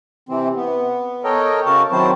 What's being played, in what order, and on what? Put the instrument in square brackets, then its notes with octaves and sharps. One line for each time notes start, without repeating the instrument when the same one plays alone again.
[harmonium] C3 E3 C4
B3
A4 A#4 C#5 D#5 G5
C#3 F#4 A#4 A5
D#3 F#3 C4 E4 C5 A5